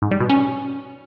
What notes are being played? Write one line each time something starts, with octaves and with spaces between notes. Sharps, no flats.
G#2
G3
B2
C#4